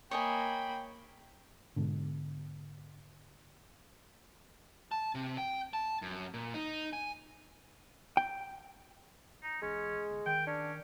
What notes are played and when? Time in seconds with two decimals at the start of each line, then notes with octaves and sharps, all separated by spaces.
0.11 A#3 C#5 D#5 G5 G#5 B5
1.76 G#2 B2 D3
4.91 A5
5.15 C3
5.38 G5
5.73 A5
6.02 F#2
6.34 A#2
6.54 D#4
6.93 G#5
8.17 G5
9.43 D#4
9.62 A1 G#3 C#4
10.10 G1
10.26 D#3 G5
10.47 C#4 D4